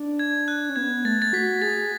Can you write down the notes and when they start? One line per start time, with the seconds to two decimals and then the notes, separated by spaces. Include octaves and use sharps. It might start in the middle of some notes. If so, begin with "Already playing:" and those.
Already playing: D4
0.19 G#6
0.48 F#6
0.70 C#4
0.76 B3 G#6
1.05 A3 A6
1.22 A6
1.33 F#4 B6
1.62 G#4 A6